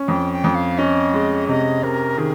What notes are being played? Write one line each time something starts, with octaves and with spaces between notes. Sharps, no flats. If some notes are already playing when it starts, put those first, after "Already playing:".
Already playing: C#4
F2 G5
G5
F2
F5
C#4 D#5
G#3
C3 D#5
C3 A#4
D#3 G#4